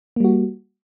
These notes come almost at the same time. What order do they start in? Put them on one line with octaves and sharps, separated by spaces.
A#3 G3 F#4